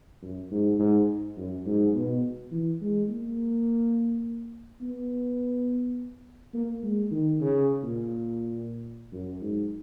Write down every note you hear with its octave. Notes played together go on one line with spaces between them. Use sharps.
F#2
G#2
G#2
F#2
G#2
B2
E3
G#3
A#3
B3
A#3
G#3
D#3
C#3
A#2
F#2
G#2